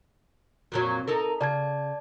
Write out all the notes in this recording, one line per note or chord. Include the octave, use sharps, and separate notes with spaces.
F2 A#2 F#3
D#4 A4 A#4
C#3 D5 A5 G#6